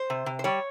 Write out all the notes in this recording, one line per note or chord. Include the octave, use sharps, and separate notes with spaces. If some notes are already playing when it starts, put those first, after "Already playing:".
Already playing: C5
C3
C3
C5
G3 C#5